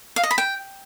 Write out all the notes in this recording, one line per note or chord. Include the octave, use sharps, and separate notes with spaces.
F5
D#5
B5
G5